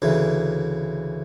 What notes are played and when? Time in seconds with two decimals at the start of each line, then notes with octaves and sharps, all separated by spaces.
0.02 D2 C#3 E3